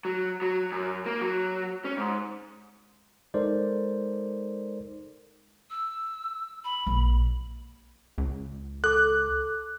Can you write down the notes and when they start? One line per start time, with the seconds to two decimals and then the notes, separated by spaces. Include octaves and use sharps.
0.05 F#3
0.42 F#3
0.72 F#2
1.06 A#3
1.21 F#3
1.85 C#4
1.97 G#2
3.34 G#3 D#4 A4 A#4 C5 D5
5.70 E6
6.65 B5
6.86 A#1 A#2
8.18 C#2
8.84 A4 D6 F#6